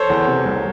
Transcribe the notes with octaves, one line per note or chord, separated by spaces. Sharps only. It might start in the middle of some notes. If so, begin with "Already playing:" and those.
Already playing: A4 C5 C#5
E2
C3
C2